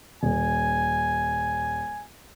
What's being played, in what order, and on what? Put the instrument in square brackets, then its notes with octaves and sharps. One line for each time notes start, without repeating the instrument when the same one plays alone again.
[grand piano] D#1 [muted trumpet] G#5